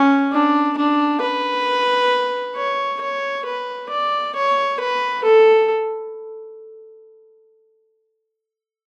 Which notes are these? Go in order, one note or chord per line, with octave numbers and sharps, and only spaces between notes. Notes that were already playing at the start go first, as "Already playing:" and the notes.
Already playing: C#4
D4
D4
B4
C#5
C#5
B4
D5
C#5
B4
A4